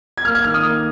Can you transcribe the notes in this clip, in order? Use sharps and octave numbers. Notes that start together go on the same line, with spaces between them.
G#6
A#3 F6
G#6
D#3 F6
D#6
A#3